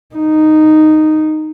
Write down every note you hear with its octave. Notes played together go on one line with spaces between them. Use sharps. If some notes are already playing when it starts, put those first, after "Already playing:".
D#4